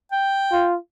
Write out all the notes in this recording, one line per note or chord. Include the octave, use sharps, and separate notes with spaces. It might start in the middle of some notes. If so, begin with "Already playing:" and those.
G5
F4